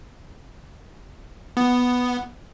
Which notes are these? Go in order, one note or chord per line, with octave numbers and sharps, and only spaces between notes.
B3